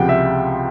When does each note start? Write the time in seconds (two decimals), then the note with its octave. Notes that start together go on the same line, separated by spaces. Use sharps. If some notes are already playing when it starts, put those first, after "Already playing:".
Already playing: C#2 C3 F3 F#5 G5
0.09 E5